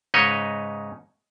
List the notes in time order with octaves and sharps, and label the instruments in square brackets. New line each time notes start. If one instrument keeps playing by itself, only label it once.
[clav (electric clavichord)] G#2 C#3 D#4 B4 C#5 D#5